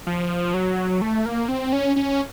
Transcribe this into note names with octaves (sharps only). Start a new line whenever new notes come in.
F3
F#3
A3
A#3
C4
C#4
C#4